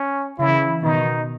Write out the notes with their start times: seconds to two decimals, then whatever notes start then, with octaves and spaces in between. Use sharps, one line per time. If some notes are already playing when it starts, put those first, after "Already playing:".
Already playing: C#4
0.39 C#3 E3 E4
0.83 B2 D#3 D#4